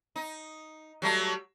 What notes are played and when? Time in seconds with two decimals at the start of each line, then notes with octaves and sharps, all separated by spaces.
0.16 D#4
1.02 F#3 G3 A3